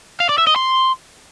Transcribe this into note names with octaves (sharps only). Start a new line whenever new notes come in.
F5
D5
E5
D#5
C6